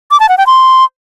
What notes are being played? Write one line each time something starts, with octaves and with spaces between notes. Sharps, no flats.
D6
A5
F#5
G5
C6